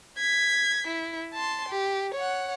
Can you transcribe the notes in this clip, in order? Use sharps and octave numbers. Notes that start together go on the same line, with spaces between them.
G#6 B6
E4
A5 C6
G4
C#5 F#5